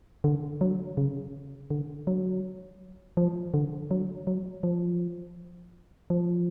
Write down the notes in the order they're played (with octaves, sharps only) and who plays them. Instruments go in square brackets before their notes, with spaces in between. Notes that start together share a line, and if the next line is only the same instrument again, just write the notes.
[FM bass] D3
F#3
C#3
D3
F#3
F3
D3
F#3
F#3
F3
F3